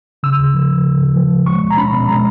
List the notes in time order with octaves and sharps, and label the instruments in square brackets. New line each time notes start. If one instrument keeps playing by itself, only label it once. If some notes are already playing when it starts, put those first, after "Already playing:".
[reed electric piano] C#3 E6
D#2
F3
D#2
C#3
D#2
F3
D#2
G#3 C#6
B2
A#5
C#4 B5
B2
G#3 A#5